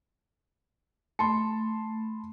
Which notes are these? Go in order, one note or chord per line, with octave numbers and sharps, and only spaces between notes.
A3 A5 B5 C6